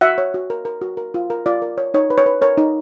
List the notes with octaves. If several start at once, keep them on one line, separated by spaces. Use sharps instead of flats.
F#4 E5 F#5
C#5
F#4
A#4
A#4
F#4
A#4
F4
A#4
F4 D5
A#4
C#5
D#4 C#5
B4
C#5
B4
A#4 C#5
D#4